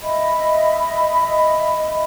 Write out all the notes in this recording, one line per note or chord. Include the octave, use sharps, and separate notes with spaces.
D#5 E5 B5